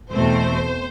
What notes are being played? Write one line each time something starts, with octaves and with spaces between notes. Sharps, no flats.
E2 B2 A3 C4 C5